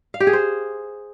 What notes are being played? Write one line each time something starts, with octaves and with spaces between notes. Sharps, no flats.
F5
G4
G#4
C5